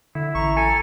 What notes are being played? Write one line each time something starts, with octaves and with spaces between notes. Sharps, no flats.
D3 E4
A1 A#5 C#6
A4 G#5